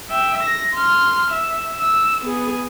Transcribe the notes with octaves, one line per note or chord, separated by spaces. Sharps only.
E5 G5
A#6
C6 F6
E5
E6
B3 G#4